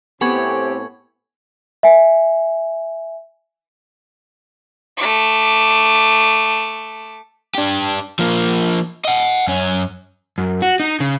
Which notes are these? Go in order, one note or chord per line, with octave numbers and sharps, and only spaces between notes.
A2 A3 B3 C4 G4 G#5 C#6 G#6
E5 G#5
A3 D6
D4 G4
F3 A#3
D#5 F#5
F#2 C#4
F#2
F#4
D#4
C#3